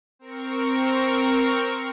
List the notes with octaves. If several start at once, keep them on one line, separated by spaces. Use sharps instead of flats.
C4 A#4 C#6